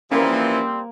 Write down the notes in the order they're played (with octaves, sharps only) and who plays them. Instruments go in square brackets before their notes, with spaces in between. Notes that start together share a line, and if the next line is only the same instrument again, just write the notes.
[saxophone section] E3 F3 [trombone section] G3 C4 [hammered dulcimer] A#3 [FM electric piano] C#4 A#4